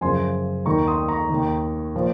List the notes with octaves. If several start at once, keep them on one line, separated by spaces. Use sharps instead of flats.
F#2 C#3 F3 G#5 C6
D#2 D#3 A#5 C#6
C6 D#6
A#5 C#6
D#2 D#3
A#2 F3